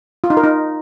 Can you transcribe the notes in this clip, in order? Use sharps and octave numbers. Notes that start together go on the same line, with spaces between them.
F4
D#4
A#4
D#4